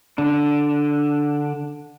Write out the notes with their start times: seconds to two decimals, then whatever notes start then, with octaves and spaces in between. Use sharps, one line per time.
0.18 D3 D4